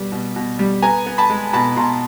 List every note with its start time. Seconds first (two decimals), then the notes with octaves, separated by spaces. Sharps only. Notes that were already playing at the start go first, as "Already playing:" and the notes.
Already playing: B2 G3 B3
0.12 B2
0.36 B2
0.59 G3
0.82 B3 G#5 A#5
1.06 B3
1.18 A5 B5
1.30 G#3
1.53 B2 A5 B5
1.77 B2 A#5 C6